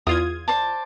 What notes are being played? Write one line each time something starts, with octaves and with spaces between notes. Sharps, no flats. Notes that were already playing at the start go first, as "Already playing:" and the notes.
E2 F4 D#6 G#6
C5 D5 A5